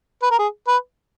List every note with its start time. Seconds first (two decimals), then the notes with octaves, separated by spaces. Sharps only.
0.22 B4
0.31 A#4
0.39 G#4
0.68 B4